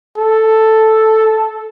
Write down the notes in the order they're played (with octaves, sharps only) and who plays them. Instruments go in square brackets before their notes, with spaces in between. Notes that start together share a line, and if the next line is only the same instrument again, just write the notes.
[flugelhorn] A4